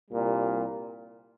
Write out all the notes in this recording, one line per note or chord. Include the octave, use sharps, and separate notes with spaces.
C2 A#2 G3